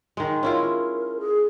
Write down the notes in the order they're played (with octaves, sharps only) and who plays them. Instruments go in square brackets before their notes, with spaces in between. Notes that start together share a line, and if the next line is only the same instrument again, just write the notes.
[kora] D#3 G#3
[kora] C#4 E4 F4 [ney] A#4
[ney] G#4